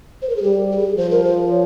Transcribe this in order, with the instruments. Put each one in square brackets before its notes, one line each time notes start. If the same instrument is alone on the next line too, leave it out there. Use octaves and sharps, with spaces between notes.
[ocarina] C5
A#4
G#4
[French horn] G3 [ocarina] G4
[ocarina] G4
G#4
[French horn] F3 [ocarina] C5
[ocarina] A#4
C5
C#5